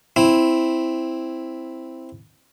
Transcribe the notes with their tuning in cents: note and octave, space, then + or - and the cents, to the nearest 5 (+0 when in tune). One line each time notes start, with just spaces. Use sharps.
C4 +0 E4 +0